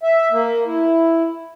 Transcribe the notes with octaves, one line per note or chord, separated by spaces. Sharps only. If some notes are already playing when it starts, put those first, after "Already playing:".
E5
A#3
E4